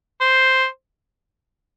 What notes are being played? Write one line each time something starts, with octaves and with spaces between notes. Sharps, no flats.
C5